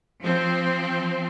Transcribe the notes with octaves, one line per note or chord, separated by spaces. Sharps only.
F3 C4